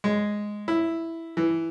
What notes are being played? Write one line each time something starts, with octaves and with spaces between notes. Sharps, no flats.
G#3
E4
E3